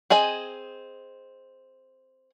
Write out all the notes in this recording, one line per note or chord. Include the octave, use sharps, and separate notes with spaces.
C4 G#4 D#5 G#5